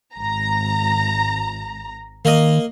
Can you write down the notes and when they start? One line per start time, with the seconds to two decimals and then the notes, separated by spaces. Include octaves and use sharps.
0.14 G#1 A#5
2.25 D#3 A#3 D#5